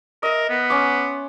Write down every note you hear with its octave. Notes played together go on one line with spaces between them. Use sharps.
A#4 D#5 E5
B3
C#4 C6 D6